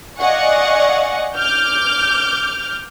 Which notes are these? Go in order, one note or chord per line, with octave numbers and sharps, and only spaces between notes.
D5 D#5 F5 F#5 G#5 C#6
D6 F6 G6